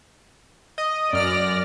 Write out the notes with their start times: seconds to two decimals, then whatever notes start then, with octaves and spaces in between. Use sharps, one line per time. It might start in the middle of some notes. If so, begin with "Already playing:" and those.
0.78 D#5
1.13 F#2 D5 F6 A#6